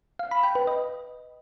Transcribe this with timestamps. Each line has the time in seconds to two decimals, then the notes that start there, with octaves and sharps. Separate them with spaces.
0.19 F5
0.31 B5
0.43 G5
0.55 B4
0.67 D#5